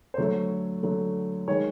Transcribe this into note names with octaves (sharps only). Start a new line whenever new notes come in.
C5
D3 F#3 A3 C#5
D3 F#3 A3
D#3 G#3 C#5